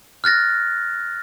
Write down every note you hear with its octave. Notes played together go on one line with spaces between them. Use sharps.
F6 F#6 A6 A#6